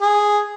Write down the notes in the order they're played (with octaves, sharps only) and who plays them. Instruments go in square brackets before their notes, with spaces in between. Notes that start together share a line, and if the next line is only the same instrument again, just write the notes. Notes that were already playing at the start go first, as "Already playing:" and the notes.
[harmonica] G#4